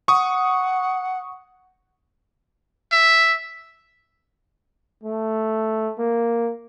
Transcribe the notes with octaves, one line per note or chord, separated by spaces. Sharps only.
F#5 C#6 D#6
E5
A3
A#3